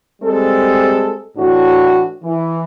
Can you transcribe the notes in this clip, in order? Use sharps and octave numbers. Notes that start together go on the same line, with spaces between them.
G3 G#3 C4 A4
A2 E3 D4 F#4
E3